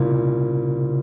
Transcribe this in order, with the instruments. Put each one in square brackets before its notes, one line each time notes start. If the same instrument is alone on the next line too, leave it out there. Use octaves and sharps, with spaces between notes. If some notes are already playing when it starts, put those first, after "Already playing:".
Already playing: [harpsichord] C2 A#2 [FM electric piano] C#3